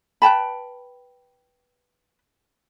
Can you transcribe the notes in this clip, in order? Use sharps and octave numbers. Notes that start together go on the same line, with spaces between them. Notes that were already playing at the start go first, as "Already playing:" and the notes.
B4 G5 A5 B5